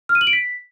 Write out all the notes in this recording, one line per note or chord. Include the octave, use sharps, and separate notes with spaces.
F6
D#7
F#7
D7
B6